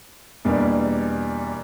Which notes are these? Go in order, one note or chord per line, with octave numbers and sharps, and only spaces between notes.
E2 B2 G3 A#3 D4